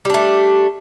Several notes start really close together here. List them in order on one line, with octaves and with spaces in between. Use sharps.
G3 D4 A3